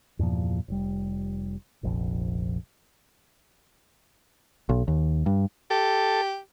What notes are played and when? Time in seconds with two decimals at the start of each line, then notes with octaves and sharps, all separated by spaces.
0.19 E2 G2 A#2 F3
0.68 F1 G3
1.83 F1 A#1 F2
4.69 B1
4.88 D#2
5.26 G2
5.70 G4 A4